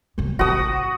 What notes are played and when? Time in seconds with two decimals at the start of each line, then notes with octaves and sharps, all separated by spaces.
0.18 C#3 C#4
0.39 A1 C4 F#4 D#6